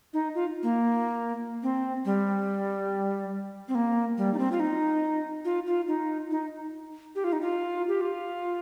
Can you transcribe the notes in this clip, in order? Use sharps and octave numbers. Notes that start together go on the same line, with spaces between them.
D#4
F4
A#3
C4
G3
C4
A#3
G3
D#4
C4
F4
D#4
F4
F4
D#4
D#4
G4
F4
D#4
F4
G4
F4